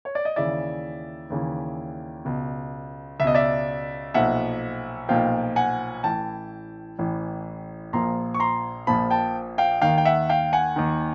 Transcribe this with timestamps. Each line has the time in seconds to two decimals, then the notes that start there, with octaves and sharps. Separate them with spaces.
0.05 C#5
0.15 D5
0.25 D#5
0.36 D#2 C#3 E3 D5 E5
1.30 D#2 C#3 E3
2.25 C#2 B2
3.20 C#2 E5
3.24 B2 D#5
3.35 D5 E5
4.14 B1 A#2 F3 E5 F#5
5.09 B1 A#2 F3 F5 G5
5.56 F#5 G#5
6.04 A1 A2 E3 G5 A5
6.99 A1 A2 E3
7.93 A#1 A#2 F3 A#5 C6
8.34 C#6
8.40 A#5 C6
8.87 A#1 A#2 F3 A5 B5
9.11 G5 A5
9.58 F5 G5
9.82 D#2 D#3 F5 G5
9.98 G5
10.05 E5 F#5
10.29 F5 G5
10.53 F#5 G#5
10.76 D#2 D#3